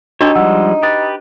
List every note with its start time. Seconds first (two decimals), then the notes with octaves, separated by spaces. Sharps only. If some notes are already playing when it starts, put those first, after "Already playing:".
0.21 D4 D#4 F#4 G4 A4 C#5
0.35 F3 G3 G#3 F#5 E6
0.83 G4 B4 D#6 A6